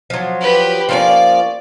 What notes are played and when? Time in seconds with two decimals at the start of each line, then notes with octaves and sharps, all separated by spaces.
0.10 F3 F#3
0.41 G4 B4
0.89 F3 A#3 C#4 D5